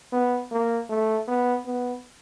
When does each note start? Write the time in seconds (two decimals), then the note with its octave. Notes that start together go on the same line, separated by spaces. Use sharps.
0.12 B3
0.51 A#3
0.89 A3
1.27 B3
1.66 B3